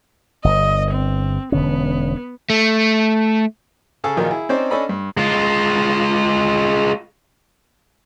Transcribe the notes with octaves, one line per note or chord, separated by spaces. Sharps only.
G1 D#5
C4
E1 D3 B3 C#4
A3
C#3 G#4 A4
A#1 D#3 F#3 D#4 F4 G#4
E4 G#4
C4 C#4 D#4 C5 D5
C#4 D4 A4 D#5 B5
G2
G#3 F4